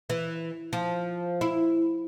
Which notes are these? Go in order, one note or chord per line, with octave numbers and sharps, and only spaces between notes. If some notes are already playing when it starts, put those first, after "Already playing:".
E3
F3
E4